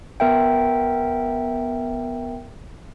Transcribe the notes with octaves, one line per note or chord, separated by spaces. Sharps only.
B3 A#4 E5 G5